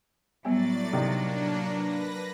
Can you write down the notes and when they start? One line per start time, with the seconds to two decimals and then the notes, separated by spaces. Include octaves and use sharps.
0.45 A2 F#3 G3 B3 D5 G#5 A6
0.93 C3 D#3 A#3 D4
1.73 B4 A#6